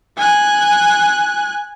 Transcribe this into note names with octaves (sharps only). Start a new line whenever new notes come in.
G#5 F#6